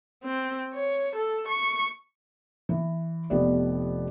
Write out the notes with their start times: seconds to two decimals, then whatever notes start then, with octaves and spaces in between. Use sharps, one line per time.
0.24 C4
0.73 C#5
1.16 A4
1.48 C#6
2.69 E3
3.30 F1 B3 G4 D5